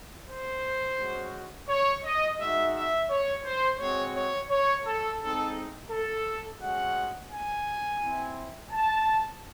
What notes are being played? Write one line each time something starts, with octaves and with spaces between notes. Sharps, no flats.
C5
G#3 C#4 F#4
C#5
D#5
G#3 D#4 F#4 E5
E5
C#5
C5
G#3 C4 F#4 C#5
C#5
C#5
A4
G#3 C4 D#4 A4
A4
G#3 C#4 F#4 F#5
G#5
C4 E4
A5